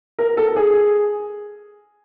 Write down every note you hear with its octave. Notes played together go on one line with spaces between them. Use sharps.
A#4
A4
G#4